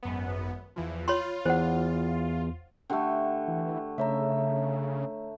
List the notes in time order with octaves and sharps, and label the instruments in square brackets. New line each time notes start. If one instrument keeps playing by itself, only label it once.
[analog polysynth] G#1 F#2 B3
E2 E3 F3
[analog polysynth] F4 [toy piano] C#5 B5 C6
[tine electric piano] E2 [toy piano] C5 F#5
[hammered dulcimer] D3 A3 [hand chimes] G4 F#5 G5
[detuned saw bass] E3
[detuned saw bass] C#3 [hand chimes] A3 C#5 A#5 [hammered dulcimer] E5